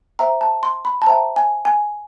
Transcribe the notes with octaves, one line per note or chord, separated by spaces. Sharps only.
C5 E5 G5 A#5
A5
C6
B5
A5
C5 E5 G5 A#5
G#5
G#5